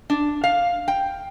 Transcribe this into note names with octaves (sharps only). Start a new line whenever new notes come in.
D4
F5
G5